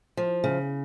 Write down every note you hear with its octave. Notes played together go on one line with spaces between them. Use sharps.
F3
C#3